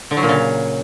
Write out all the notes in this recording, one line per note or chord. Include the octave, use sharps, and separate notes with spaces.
D3
F#3
A#2
C#3